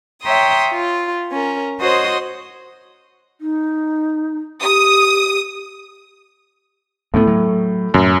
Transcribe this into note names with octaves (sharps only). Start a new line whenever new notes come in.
C#5 E5 G5 A#5 C6 D#6
F4
C#4 A#4
F#4 C5 C#5 D#5 C6 D#6
D#4
G4 D#6
D2 A2 B3
F#3
F#2 A2